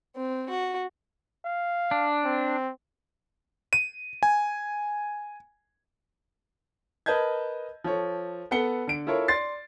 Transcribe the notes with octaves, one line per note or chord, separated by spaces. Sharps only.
C4
F#4
F5
D4
C4
D#7
G#5
A#4 B4 D#5 A5 G6 G#6
F3 A4 C#5
B3 A4 F#5 C#7 G7
D3 D7
E4 F4 A4 A#4 C#5
D5 C6 A6 C7